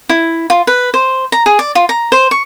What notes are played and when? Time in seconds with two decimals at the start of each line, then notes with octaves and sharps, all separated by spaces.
0.09 E4
0.50 F4
0.67 B4
0.94 C5
1.32 A#5
1.46 G#4
1.59 D5
1.75 F4
1.89 A#5
2.12 C5
2.31 C#6